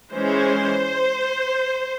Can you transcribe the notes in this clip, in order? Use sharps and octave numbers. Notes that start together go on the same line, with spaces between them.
E3 G#3 C#4 C5